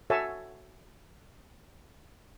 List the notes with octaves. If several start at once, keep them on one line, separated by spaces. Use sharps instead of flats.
F#4 A4 C#5 E5 G#5 A5